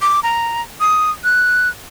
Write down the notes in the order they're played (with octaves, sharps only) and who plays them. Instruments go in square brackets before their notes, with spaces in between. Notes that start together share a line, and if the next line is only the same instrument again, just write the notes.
[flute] D6
A#5
D#6
F#6